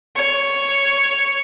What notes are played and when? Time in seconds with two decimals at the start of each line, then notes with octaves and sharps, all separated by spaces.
0.16 C#5 C#6